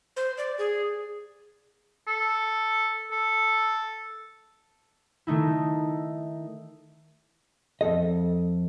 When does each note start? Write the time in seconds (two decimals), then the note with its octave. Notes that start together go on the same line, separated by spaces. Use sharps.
0.17 C5
0.38 D5
0.59 G#4
2.08 A4
3.12 A4
5.27 D#3 A3 D#4 E4
7.81 F2 C#3 A4 D#5